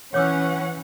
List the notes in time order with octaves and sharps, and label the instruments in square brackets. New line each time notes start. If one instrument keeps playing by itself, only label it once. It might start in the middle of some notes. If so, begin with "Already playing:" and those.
[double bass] E3 [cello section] C#4 [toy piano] C#5 D6 E6 [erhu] F#5